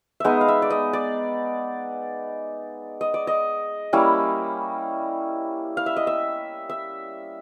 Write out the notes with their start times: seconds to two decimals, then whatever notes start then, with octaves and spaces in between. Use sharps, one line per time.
0.20 G#3 B3 D#4 D#5 E5
0.41 F5
0.48 E5
0.62 D5
0.70 D#5
0.93 D5
3.01 D#5
3.14 D5
3.27 D#5
3.93 G3 A#3 C#4 E4
5.77 F5
5.86 E5
5.96 D#5
6.07 E5
6.69 E5